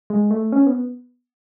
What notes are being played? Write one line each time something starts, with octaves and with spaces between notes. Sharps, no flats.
G#3
A3
C#4
B3